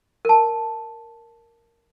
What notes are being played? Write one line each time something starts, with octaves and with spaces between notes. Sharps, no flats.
A#4 A5